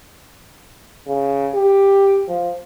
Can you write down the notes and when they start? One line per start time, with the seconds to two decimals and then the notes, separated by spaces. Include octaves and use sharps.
1.08 C#3
1.55 G4
2.28 F3